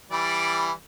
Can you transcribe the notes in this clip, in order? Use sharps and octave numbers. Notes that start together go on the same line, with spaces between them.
E3 G3 D5